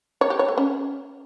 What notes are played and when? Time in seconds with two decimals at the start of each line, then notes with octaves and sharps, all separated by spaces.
0.21 C#5
0.30 G4
0.39 C#5
0.48 A3
0.58 C#4